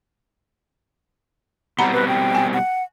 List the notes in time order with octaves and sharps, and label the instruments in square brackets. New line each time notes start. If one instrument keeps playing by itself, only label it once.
[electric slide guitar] B2 G3 C4 [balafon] F#5 A#5 B5
[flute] B4
G5
[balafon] G#5
[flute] F#5